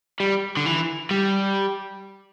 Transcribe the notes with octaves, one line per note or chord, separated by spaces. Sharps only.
G3
D3
E3
G3